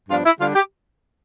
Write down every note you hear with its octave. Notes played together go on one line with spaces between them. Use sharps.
G2 F3 B3 D4 F4
E4
D3 G3 D4 F4
G4